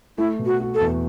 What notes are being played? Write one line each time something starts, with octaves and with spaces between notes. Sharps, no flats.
A3 E4
B2
F#4
F#4
A4
E2